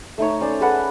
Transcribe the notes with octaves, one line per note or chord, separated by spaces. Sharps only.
A3 D#4 C#5
C#4 C5 D5
G#4 A4 B4 F#5